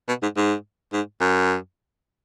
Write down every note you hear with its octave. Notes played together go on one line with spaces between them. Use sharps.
B2
G#2
G#2
G#2
F#2